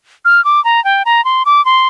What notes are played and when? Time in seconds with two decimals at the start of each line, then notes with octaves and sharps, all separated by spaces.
0.25 F6
0.45 D6
0.65 A#5
0.85 G5
1.05 A#5
1.25 C6
1.46 D6
1.65 C6